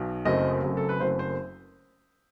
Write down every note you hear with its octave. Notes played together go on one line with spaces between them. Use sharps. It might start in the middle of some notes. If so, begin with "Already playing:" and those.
Already playing: B1 B2
F#1 F#2 F#3 A3 C4 D#5
F#1 F#2 F#3 A3 C4
A4
B4
F#1 F#2 F#3 A3 C4 C5
C5